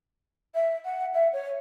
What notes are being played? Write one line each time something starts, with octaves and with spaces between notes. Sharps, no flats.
E5
F#5
E5
C#5